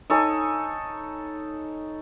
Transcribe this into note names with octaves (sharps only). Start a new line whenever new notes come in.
D#4 A4 C#5 G#5